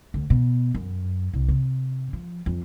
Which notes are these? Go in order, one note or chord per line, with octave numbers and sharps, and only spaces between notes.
D2
B2
F#2
C2
C3
F3
F2